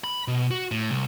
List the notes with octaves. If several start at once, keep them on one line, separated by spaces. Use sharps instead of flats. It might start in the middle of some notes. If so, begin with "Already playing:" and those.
B5
B2
F#4
A2
C2